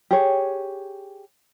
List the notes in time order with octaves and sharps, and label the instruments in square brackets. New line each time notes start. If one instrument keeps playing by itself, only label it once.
[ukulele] G4 G#4 C#5